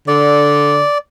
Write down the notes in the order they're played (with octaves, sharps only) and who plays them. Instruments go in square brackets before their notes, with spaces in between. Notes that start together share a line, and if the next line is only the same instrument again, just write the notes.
[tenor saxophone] D3 [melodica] D5